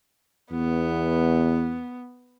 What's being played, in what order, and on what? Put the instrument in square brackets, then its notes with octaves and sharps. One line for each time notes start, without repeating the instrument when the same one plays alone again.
[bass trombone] E2 [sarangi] B3